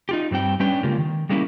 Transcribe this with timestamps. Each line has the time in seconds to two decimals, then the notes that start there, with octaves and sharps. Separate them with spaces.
0.09 D#4 F4 G4
0.31 G2 G3 C4 G5
0.60 G3 C#4 D4 G4 B4 G5
0.83 C#3 G#3 A#3 F4 G4
0.98 D#3
1.29 G3 G#3 A#3 C#4 E4 G4